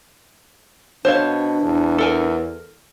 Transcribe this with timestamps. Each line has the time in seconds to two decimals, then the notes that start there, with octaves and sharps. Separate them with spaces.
1.05 B2 D4 C5 C#5 F5
1.62 E2
1.98 A4 A#4 G#5